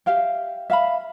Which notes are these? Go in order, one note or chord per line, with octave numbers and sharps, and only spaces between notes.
G4 E5 F5 G5
E5 F5 A#5 B5